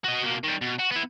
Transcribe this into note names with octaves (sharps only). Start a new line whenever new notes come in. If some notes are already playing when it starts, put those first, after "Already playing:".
F#4 D#5
B2 A#3
D#3 G3
B2
F#4
B3 E4